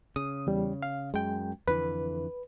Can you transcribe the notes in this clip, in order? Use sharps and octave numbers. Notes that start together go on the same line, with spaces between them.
C#3 D#6
E2 G3
F5
F#2 G#3 G5
F2 D3 E3 B4